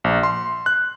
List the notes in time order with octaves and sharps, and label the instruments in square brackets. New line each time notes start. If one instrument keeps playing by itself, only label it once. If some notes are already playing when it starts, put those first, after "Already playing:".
[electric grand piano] A#1
C6
F#6